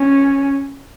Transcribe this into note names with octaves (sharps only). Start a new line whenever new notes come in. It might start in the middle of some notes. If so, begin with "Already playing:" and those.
Already playing: C#4